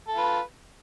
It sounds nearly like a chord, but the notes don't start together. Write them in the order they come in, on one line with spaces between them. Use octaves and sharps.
A4 F4 B4